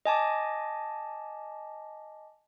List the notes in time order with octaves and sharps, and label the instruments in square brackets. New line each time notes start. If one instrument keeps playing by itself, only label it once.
[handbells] D#5 G#5 A5 D6